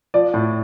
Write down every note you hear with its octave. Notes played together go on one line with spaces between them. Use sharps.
F3 D5
A2